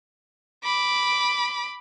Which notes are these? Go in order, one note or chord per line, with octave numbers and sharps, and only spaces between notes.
B5 D6